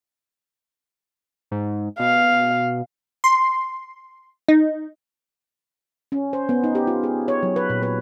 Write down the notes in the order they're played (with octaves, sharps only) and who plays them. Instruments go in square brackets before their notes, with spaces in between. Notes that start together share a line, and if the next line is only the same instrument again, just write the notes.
[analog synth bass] G#2
[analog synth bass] B2 [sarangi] F5
[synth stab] C6
D#4
[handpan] C#4
C5
B3
D#4
G4
F4
G#4
C#5
F#3
B4
A#2
B4